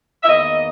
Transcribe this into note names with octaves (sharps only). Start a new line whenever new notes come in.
E5
E2 D#3 A#3 D#5